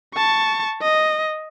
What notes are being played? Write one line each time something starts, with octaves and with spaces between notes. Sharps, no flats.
A5 C#6
D#5